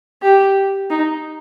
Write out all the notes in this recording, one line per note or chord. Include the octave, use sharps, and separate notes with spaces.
G4
D#4